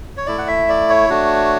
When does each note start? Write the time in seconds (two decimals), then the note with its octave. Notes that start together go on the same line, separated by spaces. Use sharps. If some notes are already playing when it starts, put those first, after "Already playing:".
0.17 C#5
0.26 A3 E4 D5
0.38 F#5
0.48 E5
0.69 D5
0.90 C#5
1.10 A3 D4 F#4